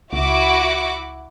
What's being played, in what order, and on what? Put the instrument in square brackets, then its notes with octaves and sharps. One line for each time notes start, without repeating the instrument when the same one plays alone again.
[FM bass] C#2 [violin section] E4 F#4 D6